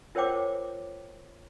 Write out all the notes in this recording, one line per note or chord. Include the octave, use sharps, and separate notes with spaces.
F4 A#4 C5 C#5 G5 D6